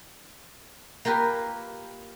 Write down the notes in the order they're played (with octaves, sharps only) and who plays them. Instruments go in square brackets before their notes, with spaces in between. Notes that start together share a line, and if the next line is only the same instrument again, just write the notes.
[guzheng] A#3 F4 G4 A#4 B4